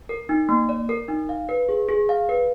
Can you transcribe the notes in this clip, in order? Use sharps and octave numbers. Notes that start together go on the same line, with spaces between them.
A#4
D#4
A#3
D5
A#4
D#4
F5
B4
G#4
G#4
F5
B4